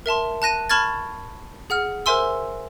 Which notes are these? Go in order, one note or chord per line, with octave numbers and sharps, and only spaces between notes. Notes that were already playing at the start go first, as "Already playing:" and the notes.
A#4 E5 A5 C6
A5 F#6 A#6 D#7
A5 B5 C#6 F6 G#6 A6
G#4 F#5 F6
A#4 C5 E5 G#5 C6 E6